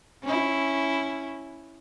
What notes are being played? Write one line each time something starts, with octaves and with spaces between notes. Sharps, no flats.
C#4 E4